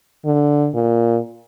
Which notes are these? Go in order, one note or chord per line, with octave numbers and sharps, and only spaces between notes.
D3
A#2